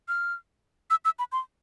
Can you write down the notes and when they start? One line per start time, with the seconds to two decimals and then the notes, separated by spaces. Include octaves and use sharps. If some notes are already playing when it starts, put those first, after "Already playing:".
0.08 F6
0.90 E6
1.05 E6
1.19 B5
1.32 C6